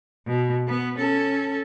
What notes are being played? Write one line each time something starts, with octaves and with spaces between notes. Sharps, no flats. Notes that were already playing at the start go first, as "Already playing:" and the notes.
B2
B3
C#4 A4